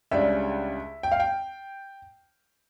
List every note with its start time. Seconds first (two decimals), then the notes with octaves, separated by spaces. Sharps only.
0.11 C#2 C#3 G3 D4 E5
1.03 G5
1.12 F5
1.20 G5